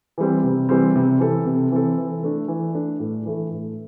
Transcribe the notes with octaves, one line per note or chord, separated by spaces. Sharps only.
E3 G3 C4
C3
E3 G3 C4
C3
E3 C4 A4
C3
E3 C4 A4
E3
A3 D4
E3
A3 D4
A2
E3 A3 E4 A4
A2